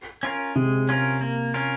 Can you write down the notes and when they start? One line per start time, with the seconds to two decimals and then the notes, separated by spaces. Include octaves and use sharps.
0.23 C#4 F4 A#4
0.56 C3 G#3
0.89 C#4 F4 A#4
1.21 A#3
1.54 C#4 F4 A#4